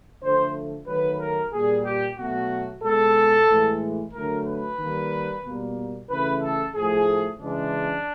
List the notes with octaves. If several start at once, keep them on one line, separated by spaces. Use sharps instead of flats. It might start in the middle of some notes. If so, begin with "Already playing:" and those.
D3 F3 A3 C5
D#3 F#3 A3 B4
A#4
A#2 G3 A#3 G#4
G4
B2 F#3 A3 F#4
B2 G#3 A4
A2 E3 G#3
D3 F#3 A3 A#4
B4
D#3 G3 A#3
B2 G3 A#3
C#3 E3 A3 B4
A4
A2 F3 A3 G#4
C#3 E3 G#3 D4